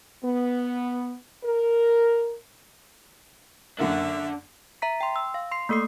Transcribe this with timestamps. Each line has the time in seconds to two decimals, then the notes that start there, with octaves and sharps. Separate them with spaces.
0.24 B3
1.44 A#4
3.79 F#2 D3 A#3 D4 E5 F#5
4.82 E5 A#5 B6
5.01 G5 C6
5.16 E6
5.34 F5
5.52 C6 C7
5.69 A3 A#3 A4 D#6 C7